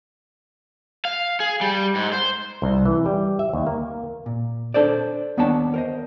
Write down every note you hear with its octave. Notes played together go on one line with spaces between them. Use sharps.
F5
G#4
G3
G#2
C5
C2
E3
G3
E5
D#2
A#3
A#2
D4 A4 C5 D5
D#2 B3 D4 C#5 G5 A5
A#4 C5 D#5